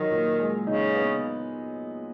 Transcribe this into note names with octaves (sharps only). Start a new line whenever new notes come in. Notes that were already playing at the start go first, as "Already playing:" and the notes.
Already playing: D#3 F#3
A#2
G#3
C#3 D#4
B3